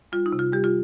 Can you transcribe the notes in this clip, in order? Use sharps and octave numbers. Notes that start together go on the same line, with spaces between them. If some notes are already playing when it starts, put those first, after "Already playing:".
G3 F4
D#4
C3
F4
G3 G4
F4